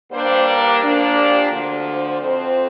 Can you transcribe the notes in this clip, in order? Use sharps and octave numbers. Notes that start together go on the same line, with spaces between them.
G2 G3 A#3 D4 C5
A#4
A#2 F3 A#3 D4
G4
D2 D3 F3
C5
F2 F3 C4